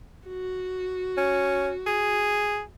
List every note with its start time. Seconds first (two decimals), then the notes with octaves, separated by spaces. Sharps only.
0.28 F#4
1.18 C#4
1.87 G#4